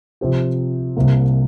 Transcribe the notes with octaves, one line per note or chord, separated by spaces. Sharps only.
C3 F3 C4 G4
C2 C3 A#3